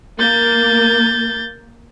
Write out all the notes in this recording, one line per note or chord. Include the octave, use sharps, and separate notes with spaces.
A#3 G6 A6